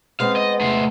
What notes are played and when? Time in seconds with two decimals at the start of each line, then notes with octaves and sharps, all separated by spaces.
0.20 G#3 B3 C4 F5
0.36 D#5
0.61 A3 C5